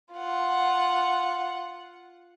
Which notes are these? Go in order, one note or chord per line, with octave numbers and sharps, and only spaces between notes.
F4 F#5